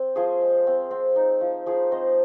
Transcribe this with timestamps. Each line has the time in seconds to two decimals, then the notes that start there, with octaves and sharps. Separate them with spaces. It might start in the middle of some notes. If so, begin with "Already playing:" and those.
Already playing: C4
0.16 F3 G#4 C5
0.41 G#3
0.67 C4
0.91 C4
1.16 D#4
1.41 F3
1.66 F3 G#4 C5
1.91 C4 C5 D#5